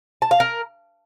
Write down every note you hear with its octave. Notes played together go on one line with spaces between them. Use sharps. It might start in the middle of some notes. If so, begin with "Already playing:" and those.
A5
F5
A#4